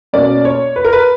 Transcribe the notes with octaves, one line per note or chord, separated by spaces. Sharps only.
B2 A#3 C#4 D5
C#5
B4
A#4
B4